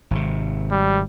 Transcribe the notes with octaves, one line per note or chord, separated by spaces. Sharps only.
G#1 C3
G3